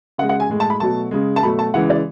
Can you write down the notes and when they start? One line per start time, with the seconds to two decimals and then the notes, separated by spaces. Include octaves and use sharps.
0.18 C#3 F#5
0.22 G#3
0.29 F#5
0.40 G#5
0.49 A2 G#3
0.60 A5
0.70 B5
0.80 B2 F#3 A3 A5
1.11 C#3 G#3
1.36 A5
1.43 B2 F#3 A3 B5
1.59 A5
1.74 C#3 E3 G#3 F#5
1.90 D5